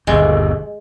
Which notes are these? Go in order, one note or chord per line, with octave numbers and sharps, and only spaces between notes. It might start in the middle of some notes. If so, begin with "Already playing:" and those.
G1 D#2 B2 G#3